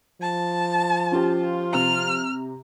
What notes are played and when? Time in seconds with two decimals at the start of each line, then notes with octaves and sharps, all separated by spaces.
0.22 F3 A5
1.12 C#4 F4 G4
1.73 C3 A#5 F6